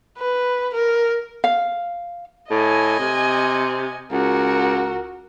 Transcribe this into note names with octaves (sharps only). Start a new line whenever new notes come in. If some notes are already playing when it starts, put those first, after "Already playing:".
B4
A#4
F5
A2 D#5 G#5
C3
C#2 F#4 A#4